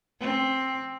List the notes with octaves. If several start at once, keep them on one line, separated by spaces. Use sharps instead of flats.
C4